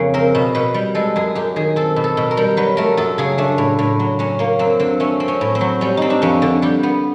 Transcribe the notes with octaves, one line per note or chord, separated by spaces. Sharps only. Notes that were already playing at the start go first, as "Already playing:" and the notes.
Already playing: F2 C#3 A#3 G#4
C4 A#4
B2
B2 B4
G3
G#3 A4
F#2 G#4
F#2 G4
D#3 G#4
C4 A4
B2
A4
B2
A#4
G3
F#3 B4
A3 A#4
F#2 A4
C#3 G#4
A3 D4
A2
A2
F#3
F#3 C#4
A#3 C#4
F#2 C4
D3 C4
A3 C#4
C4
C#4
A2
C4
F#3
G3 C#4
C4 D#4
D4
F2 C#4
D3
G3 G4
B3